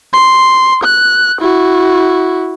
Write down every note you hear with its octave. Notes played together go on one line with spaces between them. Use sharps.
C6
F#6
E4 F#4